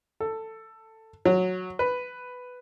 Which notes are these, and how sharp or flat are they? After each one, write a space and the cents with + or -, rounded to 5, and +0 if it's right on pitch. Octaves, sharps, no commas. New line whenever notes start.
A4 +10
F#3 -10
B4 +5